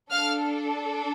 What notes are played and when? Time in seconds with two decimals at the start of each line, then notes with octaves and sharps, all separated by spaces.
0.11 D4 A4 F5 F6